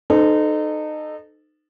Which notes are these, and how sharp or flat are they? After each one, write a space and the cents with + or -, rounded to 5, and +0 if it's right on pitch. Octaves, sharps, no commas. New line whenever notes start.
D#4 -25 A4 -10 C5 -35